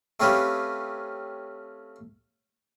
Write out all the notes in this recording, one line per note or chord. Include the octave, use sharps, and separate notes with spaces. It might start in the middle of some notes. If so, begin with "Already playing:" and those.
A3 C4 C#4 F4 G4 B4